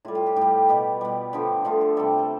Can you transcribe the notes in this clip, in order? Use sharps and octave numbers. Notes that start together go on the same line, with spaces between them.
A2 G3 F4
F4
G4
A2 G3 G4
B2 G3
B2 G3
D3 F3 A3 G4
D3 F3 A3 F4
A4
C3 G3 A4
A4